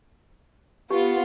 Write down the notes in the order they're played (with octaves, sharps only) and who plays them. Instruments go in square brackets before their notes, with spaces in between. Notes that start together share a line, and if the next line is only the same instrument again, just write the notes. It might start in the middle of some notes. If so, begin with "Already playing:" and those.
[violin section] B3 F4 [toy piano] G4